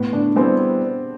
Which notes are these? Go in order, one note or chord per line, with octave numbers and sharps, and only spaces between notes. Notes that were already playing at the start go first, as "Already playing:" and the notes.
Already playing: A2 B3
D4
G3 B3 C4 E4